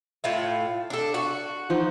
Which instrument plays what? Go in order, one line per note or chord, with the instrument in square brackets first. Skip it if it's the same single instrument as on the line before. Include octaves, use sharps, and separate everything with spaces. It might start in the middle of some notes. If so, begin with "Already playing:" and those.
[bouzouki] A2 F4 E5
D4 A4
F#4
[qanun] F3 D#4 F#4